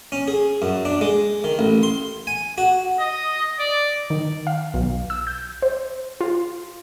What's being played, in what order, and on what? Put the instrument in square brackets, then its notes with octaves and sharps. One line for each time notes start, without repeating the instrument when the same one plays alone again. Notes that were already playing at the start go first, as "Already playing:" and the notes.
[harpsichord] C#4
G#4
F#2
D4
G#3
D#3
A1
C6
G#5
F#4
[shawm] D#5
D5
[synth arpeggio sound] D#3
F5
B1
E6
G6
C5
F4